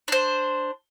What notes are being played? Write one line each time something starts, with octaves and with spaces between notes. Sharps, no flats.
D4 C5